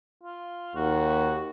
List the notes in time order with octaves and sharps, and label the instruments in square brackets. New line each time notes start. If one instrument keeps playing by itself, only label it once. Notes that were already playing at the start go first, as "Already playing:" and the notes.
[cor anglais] F4
[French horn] D#2 [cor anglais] F#4